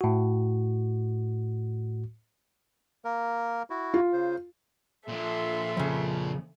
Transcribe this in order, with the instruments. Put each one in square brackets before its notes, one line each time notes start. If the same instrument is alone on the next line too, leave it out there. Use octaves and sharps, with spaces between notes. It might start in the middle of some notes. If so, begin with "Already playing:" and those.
[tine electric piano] A2 F#4
[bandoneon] A#3 A#4
E4 F#4
[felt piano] F4
[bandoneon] C#3 C5
[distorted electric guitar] A#2 F3 [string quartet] A4 E5 C6
[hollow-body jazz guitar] F2 C#3